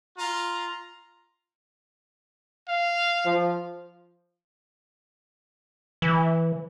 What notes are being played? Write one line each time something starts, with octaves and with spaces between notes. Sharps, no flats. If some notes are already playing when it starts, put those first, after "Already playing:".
F4 A#5
F5
F3
E3